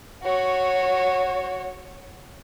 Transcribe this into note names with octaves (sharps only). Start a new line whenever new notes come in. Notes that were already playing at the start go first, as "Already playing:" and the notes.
F#4 C#5